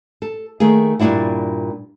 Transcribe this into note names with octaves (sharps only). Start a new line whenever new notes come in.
A4
D#3 A3 A#3 G#4
G2 A#2 C#3 D4 E4 F#4